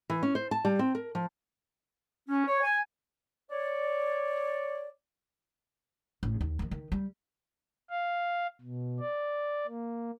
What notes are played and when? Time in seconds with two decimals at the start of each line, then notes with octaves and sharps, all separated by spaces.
0.10 E3
0.23 C#4
0.35 C5
0.51 A5
0.65 G3
0.79 C4
0.95 A#4
1.15 F3
2.29 C#4
2.47 C#5
2.64 G#5
3.51 C#5 D5
6.23 A1
6.41 D#2
6.59 D#3 F3
6.71 D#3
6.92 G3
7.90 F5
8.61 B2
9.00 D5
9.67 A#3